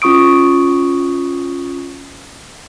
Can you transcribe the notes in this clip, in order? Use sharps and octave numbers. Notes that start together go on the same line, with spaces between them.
C#4 F4 C#6 D#6 D7